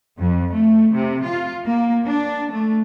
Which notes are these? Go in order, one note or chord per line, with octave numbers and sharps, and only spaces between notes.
F2
A3
C3
F4
A#3
D4
A3